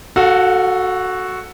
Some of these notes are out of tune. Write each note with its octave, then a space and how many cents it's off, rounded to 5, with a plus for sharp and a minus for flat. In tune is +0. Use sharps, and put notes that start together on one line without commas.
F#4 +0 A4 +0 F5 +40